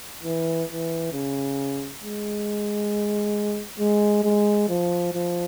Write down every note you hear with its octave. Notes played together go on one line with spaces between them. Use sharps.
E3
E3
C#3
G#3
G#3
G#3
F3
F3